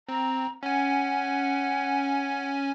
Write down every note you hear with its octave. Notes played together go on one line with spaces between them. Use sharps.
C4 A#5
C#4 F#5 G#5